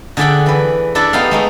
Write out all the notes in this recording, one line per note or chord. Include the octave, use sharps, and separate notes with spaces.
D3 G#4 D5 E5 F#5 G5
E3 B4
D4 E4 A4 D5 E5
B3 D#4 G4 F5
G#3 A3 D#4